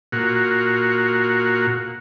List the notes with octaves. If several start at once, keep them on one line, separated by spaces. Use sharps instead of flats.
A#2 F#4